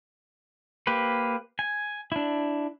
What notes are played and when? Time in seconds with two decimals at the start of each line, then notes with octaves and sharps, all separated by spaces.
0.87 A#3 G4 B4 C5
1.59 G#5
2.12 D4 E4